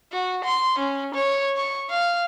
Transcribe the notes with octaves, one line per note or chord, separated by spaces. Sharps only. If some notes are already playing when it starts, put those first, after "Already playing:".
F#4
C6
C#4
C#5
C#6
F5